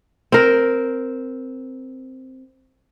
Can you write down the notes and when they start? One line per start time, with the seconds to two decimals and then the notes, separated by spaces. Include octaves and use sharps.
0.32 C4 A#4